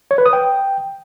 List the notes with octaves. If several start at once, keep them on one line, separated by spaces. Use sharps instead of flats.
C#5
B4
D#6
G5